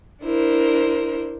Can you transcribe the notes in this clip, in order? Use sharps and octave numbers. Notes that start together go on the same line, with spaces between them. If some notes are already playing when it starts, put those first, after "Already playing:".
D4 E4 A#4 C5